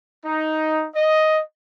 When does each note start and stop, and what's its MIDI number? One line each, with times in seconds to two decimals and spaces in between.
0.24 0.85 63
0.94 1.40 75